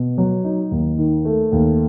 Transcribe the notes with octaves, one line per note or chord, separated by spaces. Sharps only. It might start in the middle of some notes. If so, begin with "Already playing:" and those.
Already playing: B2
F#3
D#4
D#2
D#3
A3
D#2